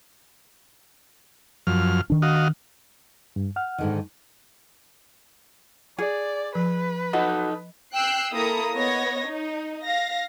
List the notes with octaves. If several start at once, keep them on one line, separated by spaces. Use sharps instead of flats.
F#2 F3 F6
D#3 D4
F#4 D#5 F5
G2
F#5 F6
G#2 D3 D#3
G#4 D5
F3 B4
D#4 F#4 A4 D#5
G5 E6 F#6 C7
A#3 E4 A4 A#5 D#6
B3 C#5 D#5 A#6
D#4
F5 A#6